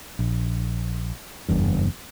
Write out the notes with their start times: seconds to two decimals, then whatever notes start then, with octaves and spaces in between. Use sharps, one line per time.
0.19 A#1
1.48 F#1 E2 G2